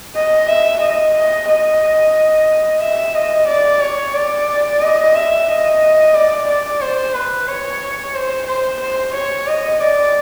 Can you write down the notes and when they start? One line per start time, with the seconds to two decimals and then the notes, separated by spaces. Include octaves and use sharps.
0.15 D#5
0.49 E5
0.81 D#5
1.15 D#5
1.48 D#5
2.81 E5
3.15 D#5
3.48 D5
3.82 C#5
4.14 D5
4.82 D#5
5.15 E5
5.48 D#5
6.15 D5
6.49 D5
6.82 C5
7.15 B4
7.48 C#5
8.15 C5
8.48 C5
8.81 C5
9.15 C#5
9.47 D#5
9.81 D5